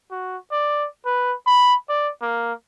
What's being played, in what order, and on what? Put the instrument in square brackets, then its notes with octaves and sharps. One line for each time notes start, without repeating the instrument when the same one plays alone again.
[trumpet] F#4
D5
B4
B5
D5
A#3